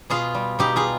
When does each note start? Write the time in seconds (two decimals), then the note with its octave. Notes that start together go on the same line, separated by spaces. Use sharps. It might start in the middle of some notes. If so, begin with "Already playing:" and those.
0.10 B2 F4 G#4
0.34 G3
0.59 B2 D#4 G4
0.76 F4 G#4